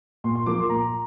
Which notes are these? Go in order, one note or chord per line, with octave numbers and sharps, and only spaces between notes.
A#2 C6
C6
F3 A#3 D6
C6
A#2 A#5